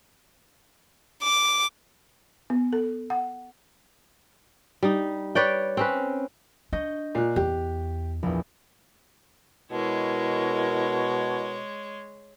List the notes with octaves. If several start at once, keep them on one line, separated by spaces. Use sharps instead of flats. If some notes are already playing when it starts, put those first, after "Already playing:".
D6
B3
A4
F#5
G3 D#4
B4 C#5 D5 G5
C4 C#4 B4
D4 D#5 C#6 G6
A#2 F#6 C7
E2 G4
A#1 E2
B2 G#3 E4 A#4 C#5